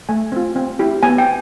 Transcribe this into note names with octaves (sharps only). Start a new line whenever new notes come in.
A3 G#5
C4 F4
C4
E4 G4
B3 G#5
G5